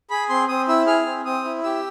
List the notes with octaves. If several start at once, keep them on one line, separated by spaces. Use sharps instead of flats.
G#4 B5
C4 C6
C4 D#6
E4 E6
G#4 F6
C4
C4 D#6
E4
G4 E6